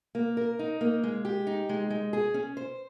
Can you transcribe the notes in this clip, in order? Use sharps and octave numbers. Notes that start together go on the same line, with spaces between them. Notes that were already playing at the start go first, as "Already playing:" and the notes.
A#3
A#4
D#4
A#3
G#3
G4
D#4
G#3
G#3
G#4
C#4
C5